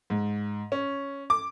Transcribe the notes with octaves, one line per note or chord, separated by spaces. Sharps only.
G#2
C#4
D6